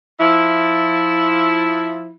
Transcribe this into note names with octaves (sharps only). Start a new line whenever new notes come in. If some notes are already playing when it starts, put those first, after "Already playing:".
F3 E4